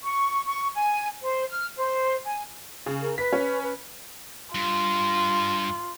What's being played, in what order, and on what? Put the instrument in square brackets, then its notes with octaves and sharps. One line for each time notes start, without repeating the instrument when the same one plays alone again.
[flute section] C#6
C#6
G#5
C5
F6
C5
G#5
[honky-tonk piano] C#3
[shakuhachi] A#4
[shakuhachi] B4 [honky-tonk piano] B6
[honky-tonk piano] C#4
[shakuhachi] B4
[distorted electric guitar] G2 [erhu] F4